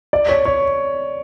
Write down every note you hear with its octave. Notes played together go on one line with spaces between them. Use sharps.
D5
C#5
C#5